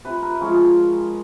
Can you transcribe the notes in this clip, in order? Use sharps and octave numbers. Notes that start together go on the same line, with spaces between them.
C3 B4
A#4
F3 G#3 C#4